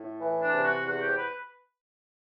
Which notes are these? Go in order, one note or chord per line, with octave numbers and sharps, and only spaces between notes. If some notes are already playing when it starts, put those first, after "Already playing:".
Already playing: A2
E3
D4
C3
F#4
E2 F#4
G4
B4